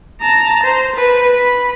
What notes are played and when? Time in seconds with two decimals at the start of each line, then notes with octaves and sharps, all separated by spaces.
0.21 A5 A#5
0.63 C5
0.95 B4
1.32 B5